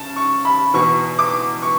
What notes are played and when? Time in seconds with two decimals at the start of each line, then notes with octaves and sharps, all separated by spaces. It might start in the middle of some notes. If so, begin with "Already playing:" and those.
Already playing: C#2 C#3 A5
0.16 C#6
0.45 B5
0.74 E2 B2 C#6
1.19 D6
1.62 C#6